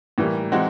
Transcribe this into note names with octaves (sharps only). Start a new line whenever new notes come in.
A2 E3 G3 A#3
E3 G#3 C4 D#4 F#4